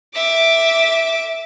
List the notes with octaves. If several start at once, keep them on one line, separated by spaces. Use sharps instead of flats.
E5 D6